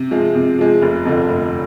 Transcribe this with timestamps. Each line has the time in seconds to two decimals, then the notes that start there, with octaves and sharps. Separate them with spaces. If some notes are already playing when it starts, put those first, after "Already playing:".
Already playing: C3
0.11 F3 G#3
0.35 C3
0.59 F3 G#3
0.82 F1
1.05 F2 D3 F3
1.29 F1